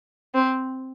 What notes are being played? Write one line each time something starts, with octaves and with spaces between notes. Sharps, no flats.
C4